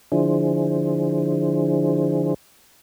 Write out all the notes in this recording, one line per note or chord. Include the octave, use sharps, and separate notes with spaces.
D3 F3 D4 E4 G#4 C5